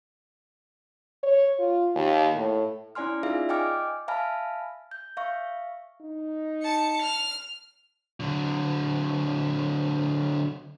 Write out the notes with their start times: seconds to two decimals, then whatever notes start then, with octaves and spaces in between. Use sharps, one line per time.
1.23 C#5
1.59 F4
1.95 D#2
2.36 A2
2.95 C#4 E4 D5 G#5 C6 F6
3.23 D#4 F4 G#4 D5 E5 F5
3.49 D#5 G5 G#5 D6 F6
4.08 E5 F5 G#5 A5 B5 F6
4.91 G6
5.17 E5 F5 C#6
6.01 D#4
6.62 A5 C#7
7.02 F6
8.20 D3 F#3